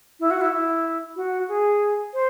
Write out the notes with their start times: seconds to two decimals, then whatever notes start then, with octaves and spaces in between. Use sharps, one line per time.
0.20 E4
0.31 F#4
0.41 E4
0.53 E4
1.16 F#4
1.49 G#4
2.14 C5